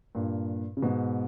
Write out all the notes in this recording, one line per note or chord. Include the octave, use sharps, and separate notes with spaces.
G2 A#2
C#3
G#2 B2